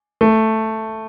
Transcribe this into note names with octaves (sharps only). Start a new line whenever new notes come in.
A3